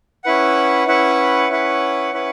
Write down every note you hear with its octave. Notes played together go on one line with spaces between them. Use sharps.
C#4 E4 B4 F#5
C#4 E4 B4 F#5
C#4 E4 B4 F#5
C#4 E4 B4 F#5